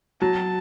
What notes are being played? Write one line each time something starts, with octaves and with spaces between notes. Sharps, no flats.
F#3 A5